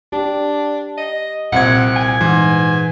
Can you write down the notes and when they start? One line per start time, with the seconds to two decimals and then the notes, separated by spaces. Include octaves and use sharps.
0.12 D4 G4
0.97 D#5
1.52 C2 A#2 C4 F#5 G#6
1.96 G#5
2.21 G#2 E3